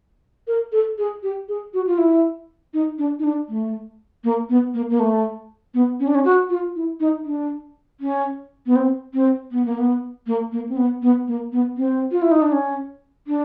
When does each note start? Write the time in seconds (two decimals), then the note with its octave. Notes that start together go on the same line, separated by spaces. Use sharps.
0.47 A#4
0.72 A4
0.98 G#4
1.23 G4
1.49 G#4
1.74 F#4
1.87 F4
1.98 E4
2.74 D#4
2.98 D4
3.19 D#4
3.24 D4
3.49 A3
4.24 A#3
4.49 B3
4.74 A#3
4.90 A#3
5.00 A3
5.74 B3
6.00 C#4
6.08 D4
6.15 C#4
6.25 F#4
6.50 F4
6.76 E4
7.00 D#4
7.25 D4
8.00 C#4
8.66 B3
8.76 C4
9.14 C4
9.51 B3
9.66 A#3
9.78 B3
10.27 A#3
10.52 A#3
10.69 C4
10.77 B3
11.02 B3
11.27 A#3
11.52 B3
11.77 C4
12.11 F4
12.22 E4
12.31 D#4
12.42 D4
12.52 C#4
13.27 D4